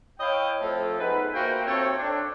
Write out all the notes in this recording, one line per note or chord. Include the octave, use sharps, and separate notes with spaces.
E4 C#5 D#5 F5 G5
F3 A3 C4 A4
B3 D#4 G#4 B4
A#3 F4 F#4 C5 E5 G5
C4 A4 C#5
D4